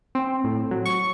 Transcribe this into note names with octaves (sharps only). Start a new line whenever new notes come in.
C4
A2
F#3
C#6